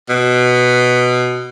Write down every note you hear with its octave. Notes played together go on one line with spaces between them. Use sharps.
B2